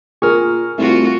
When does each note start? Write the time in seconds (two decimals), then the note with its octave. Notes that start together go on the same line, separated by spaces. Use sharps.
0.22 A#2 G#4 A#4 C#6 F6
0.78 C2 A3 F4 F#4